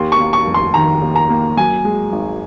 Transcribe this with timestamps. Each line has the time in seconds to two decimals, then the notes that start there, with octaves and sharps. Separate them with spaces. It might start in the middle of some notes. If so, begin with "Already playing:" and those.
Already playing: D#2 C6
0.12 C#6
0.19 A#3
0.33 C#6
0.47 F1
0.54 C6
0.74 D#3 A#5
1.02 D#2
1.16 A#5
1.30 A#3
1.57 F#2 G#5
1.85 G#3
2.12 G#1